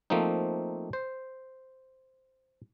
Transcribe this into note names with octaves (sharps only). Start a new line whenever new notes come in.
F3 A3 A#3 C4 D#4
C5